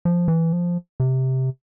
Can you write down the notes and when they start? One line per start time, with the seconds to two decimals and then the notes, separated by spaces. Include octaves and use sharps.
0.05 F3
0.28 E3
0.53 F3
1.00 C3